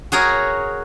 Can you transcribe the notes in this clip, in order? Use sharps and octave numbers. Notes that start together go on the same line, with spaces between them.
F#4 G#4 A#4 C#5